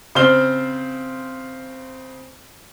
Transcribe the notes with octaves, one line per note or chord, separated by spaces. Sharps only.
C#3 C4 C5 F6 G7